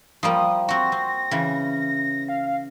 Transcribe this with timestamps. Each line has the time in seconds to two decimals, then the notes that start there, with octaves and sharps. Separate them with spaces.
0.23 F3 G3 A#3 D#6
0.69 C4 F#4 A#6
0.92 C4
1.31 C#3 E3
2.28 F5